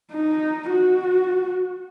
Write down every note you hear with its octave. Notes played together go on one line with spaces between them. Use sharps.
D#4
F#4